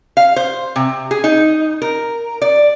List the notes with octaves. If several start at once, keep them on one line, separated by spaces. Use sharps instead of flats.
F5
C5
C3
G#4
D#4
A#4
D5